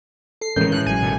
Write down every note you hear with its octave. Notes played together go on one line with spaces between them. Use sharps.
A4 C7
A2 D#3 E3 G#3 C#4 A#4 G6
A2 F#6
A1 F#3 G#5
B2 D3